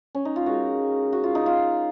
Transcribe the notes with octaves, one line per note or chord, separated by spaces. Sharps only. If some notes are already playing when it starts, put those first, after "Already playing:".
C#4
D#4
F4
D#3 G#3 F#4
F#4
F4
D#4
F4